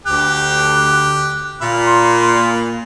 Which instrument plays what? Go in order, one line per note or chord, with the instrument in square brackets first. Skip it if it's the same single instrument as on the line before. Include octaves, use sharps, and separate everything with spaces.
[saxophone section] D2 [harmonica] G4 [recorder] F#6
[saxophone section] A#2 [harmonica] F5 B5
[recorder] C6